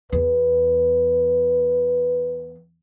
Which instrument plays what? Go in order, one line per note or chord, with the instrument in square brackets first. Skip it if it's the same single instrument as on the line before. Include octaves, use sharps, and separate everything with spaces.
[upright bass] E2 [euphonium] B4